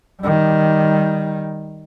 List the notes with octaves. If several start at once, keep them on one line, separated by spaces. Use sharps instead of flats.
D#3 G3